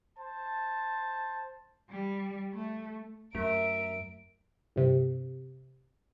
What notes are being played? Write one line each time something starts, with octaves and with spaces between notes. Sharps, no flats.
C5 A5
G3
A3
F#2 A3 A#4 E5 D7
G1 C3